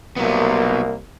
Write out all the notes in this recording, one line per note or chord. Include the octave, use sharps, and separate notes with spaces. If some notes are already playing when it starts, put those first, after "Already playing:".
C2 F#3 A#3 B3